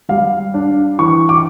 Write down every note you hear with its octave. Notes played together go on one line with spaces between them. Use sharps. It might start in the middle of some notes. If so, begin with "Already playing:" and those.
G3 F5
D4
E3 C#6
D6